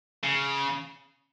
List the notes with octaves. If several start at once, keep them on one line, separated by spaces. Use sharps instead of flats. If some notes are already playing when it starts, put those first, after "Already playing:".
C#3